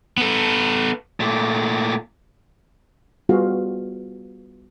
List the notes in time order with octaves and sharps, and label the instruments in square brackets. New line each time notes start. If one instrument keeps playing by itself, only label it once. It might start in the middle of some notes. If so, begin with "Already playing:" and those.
[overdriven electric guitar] B3 A4
[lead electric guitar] A#2 A3
[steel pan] G3 B3 F4 F#4 G#4 F5